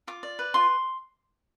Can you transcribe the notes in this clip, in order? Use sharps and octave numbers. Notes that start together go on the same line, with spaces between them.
F4 D6
D5
B4
F4 C6